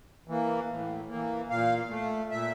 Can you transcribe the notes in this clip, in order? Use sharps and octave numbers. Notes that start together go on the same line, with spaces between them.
E3 A#3
A2
E3 A#3
A#2 F5
A3
A#2 E5